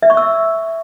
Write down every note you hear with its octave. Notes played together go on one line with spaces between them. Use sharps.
E5
C#6
E6